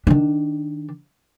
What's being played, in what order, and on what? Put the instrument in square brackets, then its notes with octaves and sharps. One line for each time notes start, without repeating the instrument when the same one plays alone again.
[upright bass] D#3 D4